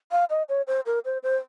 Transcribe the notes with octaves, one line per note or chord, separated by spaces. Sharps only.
F5
D#5
C#5
C5
A#4
C5
C5